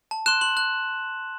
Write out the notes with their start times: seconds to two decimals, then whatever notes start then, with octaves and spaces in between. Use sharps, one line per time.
0.11 A5
0.26 C6 F#6 E7
0.41 C6 F#7
0.57 F#6